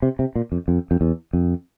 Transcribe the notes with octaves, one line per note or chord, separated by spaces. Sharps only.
C3
C3
A#2
F2
F2
F2
E2
F2